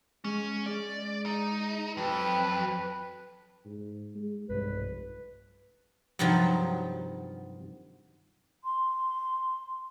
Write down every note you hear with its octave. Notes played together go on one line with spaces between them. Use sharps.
G#3 C#4
G#3 D5
D#4
F2 F#3 B4 G5
G#2
G#3
F1 B1 G2 B4
G2 C3 D#3 F3 F#3
C6